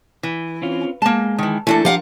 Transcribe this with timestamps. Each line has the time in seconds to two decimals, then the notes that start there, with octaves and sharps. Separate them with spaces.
0.23 E3
0.62 C4 C#4 F4
1.02 G#3 A#3 A5
1.38 D#3 E3
1.67 E3 A3 A#3 D4 A4
1.85 F3 D4 G4 A#4 F5 F#5